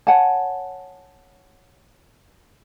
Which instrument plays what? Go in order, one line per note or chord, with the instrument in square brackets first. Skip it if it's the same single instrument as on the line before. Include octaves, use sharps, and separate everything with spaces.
[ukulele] C#5 F#5 G#5 A5